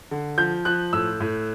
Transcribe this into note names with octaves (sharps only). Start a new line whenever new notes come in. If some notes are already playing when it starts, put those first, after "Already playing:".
D3
F3 G6
F3 F#6
A2 E6
A2